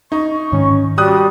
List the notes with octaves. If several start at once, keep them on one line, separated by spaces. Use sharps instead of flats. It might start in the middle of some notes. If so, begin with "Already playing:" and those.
D#4 C#6
G#2 D#3 C#4
G3 F#4 D#6 F#6